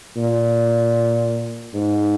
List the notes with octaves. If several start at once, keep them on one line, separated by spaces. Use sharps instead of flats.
A#2
G#2